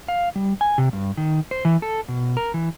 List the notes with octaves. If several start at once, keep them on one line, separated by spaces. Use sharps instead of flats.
F5
G3
G#5
C3
G2
D#3
C5
E3
A4
B2
A#4
E3